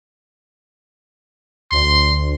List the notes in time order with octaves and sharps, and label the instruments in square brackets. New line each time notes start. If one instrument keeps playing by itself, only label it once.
[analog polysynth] D2 [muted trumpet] C6